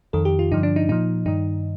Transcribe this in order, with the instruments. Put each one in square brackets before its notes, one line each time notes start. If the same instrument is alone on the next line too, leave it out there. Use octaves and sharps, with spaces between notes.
[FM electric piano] F2 D#3 A4
G4
F4
G2 D3 F3 D#4
D4
D#4
A#2 F3 D#4
G2 D#3 D#4